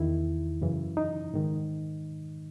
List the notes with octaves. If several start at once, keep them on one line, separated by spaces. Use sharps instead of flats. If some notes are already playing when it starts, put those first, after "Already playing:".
Already playing: E2 D#3 E4
F#2 C#3 E3
D#4
G#2 D#3